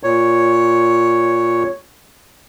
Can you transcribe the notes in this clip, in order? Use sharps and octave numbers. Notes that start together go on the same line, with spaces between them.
A#2 C#5